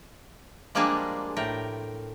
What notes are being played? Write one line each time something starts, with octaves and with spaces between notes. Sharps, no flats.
F3 G3 G#3 A#3 D4 G#4
A2 A#4 G5